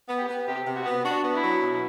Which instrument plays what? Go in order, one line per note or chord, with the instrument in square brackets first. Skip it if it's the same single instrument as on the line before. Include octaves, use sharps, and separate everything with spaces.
[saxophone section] B3
[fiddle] G4
[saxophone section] B3
[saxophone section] C3 [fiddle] G4
[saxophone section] C3
[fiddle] F#4
[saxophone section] B3
[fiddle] D4 [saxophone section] F#4
[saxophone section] B3
[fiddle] E4
[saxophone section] F#3
B2